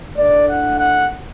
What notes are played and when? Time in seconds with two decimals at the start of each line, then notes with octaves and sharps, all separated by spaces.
0.17 A2 A3 D4 D5
0.48 F#5
0.78 F#5